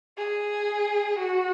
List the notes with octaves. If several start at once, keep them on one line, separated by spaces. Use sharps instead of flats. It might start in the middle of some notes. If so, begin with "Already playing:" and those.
G#4
F#4